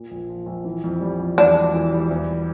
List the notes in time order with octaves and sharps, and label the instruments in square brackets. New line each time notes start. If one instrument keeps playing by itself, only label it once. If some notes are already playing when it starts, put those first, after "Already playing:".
Already playing: [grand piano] A#2
A#1
F3
A#1
E3
F2
G3
F2
[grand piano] E2 [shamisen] D4
[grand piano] E1
E3
G3
E2